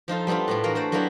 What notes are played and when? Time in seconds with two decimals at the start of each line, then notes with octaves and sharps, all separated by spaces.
0.08 F3 D#4 F4 A4
0.27 G3 B3 C4 D4 F4
0.48 A2 B3 D4
0.64 E3 A#3 F#4 A#4
0.75 A3 C5 D5
0.92 F#3 A#3 B3 D4 E4 G4